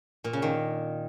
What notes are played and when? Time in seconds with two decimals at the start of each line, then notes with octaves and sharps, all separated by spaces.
0.24 A#2
0.33 C#3
0.42 D#3